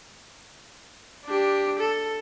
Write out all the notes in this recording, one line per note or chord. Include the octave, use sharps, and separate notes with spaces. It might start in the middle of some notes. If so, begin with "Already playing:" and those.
D4 G4
A4